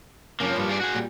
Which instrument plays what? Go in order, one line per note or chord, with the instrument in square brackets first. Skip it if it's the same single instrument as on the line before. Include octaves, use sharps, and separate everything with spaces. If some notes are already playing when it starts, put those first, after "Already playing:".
[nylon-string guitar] F#2 C#3 [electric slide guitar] F3 A#3
[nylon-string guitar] G2 G3
[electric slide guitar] F4 G#4 D5
F#4 G#4
[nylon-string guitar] A#2 G3 G4